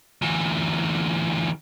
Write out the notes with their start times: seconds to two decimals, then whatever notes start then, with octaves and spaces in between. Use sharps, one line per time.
0.22 D2 E3